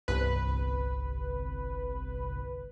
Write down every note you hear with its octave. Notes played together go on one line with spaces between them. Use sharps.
G1 C2 B4